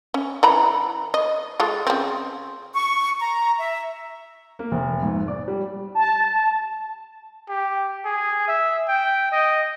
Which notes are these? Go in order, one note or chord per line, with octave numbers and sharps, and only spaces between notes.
C#4
E3 A#5 B5
D#5
G#3 F4 A4
C#3 C4
C#6
A#5
E5
A#3
F1
G#2
D5
G3
A5
G4
G#4
E5
G5
D#5